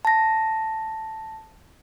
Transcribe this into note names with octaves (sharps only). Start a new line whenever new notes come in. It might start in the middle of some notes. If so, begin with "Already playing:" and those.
A5 A#6